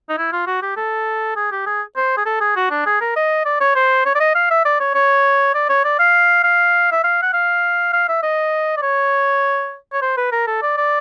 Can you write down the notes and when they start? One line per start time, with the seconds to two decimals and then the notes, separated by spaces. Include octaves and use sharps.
0.09 D#4
0.18 E4
0.32 F4
0.47 F#4
0.62 G4
0.77 A4
1.36 G#4
1.52 G4
1.66 G#4
1.96 C5
2.17 G#4
2.26 A4
2.41 G#4
2.56 F#4
2.70 D4
2.86 G#4
3.01 A#4
3.16 D#5
3.46 D5
3.60 C#5
3.76 C5
4.06 C#5
4.15 D5
4.20 D#5
4.35 F5
4.51 E5
4.65 D5
4.80 C#5
4.95 C#5
5.54 D5
5.70 C#5
5.84 D5
5.99 F5
6.44 F5
6.92 E5
7.04 F5
7.23 F#5
7.33 F5
7.93 F5
8.09 E5
8.23 D#5
8.77 D5
8.82 C#5
9.93 C#5
10.02 C5
10.17 B4
10.32 A#4
10.47 A4
10.62 D5
10.77 D5